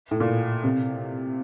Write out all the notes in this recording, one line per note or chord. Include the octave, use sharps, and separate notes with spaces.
A2
A#2
C3